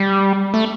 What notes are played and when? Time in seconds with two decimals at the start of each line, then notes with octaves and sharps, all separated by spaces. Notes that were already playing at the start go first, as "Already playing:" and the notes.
Already playing: G3
0.54 A3